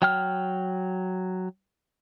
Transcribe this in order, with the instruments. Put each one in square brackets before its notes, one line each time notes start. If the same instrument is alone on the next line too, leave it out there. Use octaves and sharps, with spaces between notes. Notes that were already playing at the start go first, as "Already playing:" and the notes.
[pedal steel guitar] F#3 G5 F6